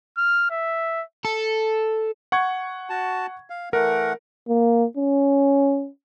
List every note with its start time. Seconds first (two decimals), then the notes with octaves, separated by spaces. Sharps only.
0.17 F6
0.51 E5
1.25 A4
2.32 F#5 C#6 G#6
2.90 F#4 A5
3.50 F5
3.73 E3 A3 A#4 F#5
4.49 A#3
4.97 C#4